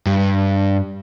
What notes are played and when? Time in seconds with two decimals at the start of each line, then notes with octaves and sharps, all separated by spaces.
0.06 G2